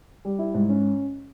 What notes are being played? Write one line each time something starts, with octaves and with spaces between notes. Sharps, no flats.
G3
E4
G#2
C#4